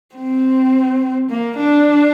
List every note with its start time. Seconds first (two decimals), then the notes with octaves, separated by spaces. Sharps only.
0.15 C4
1.30 A#3
1.58 D4